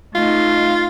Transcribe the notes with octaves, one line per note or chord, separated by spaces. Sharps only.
A3 D#4 F4